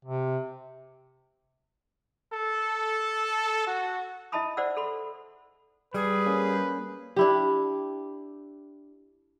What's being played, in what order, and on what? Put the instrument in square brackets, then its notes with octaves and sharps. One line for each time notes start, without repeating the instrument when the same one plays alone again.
[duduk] C3
[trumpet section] A4
F#4
[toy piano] E4 D#5 E5 A5 B5 D#6
C5 D5 F#5 E6
A4 B5 C6
[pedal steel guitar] G3 [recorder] G#4 [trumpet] B4
[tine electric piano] A#3 C#4
[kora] D4 E4 G4